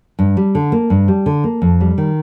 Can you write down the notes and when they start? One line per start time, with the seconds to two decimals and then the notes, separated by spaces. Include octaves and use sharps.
0.19 G2
0.37 G3
0.55 D3
0.72 A#3
0.90 G2
1.08 G3
1.26 D3
1.44 A#3
1.62 F2
1.81 G3
1.98 D#3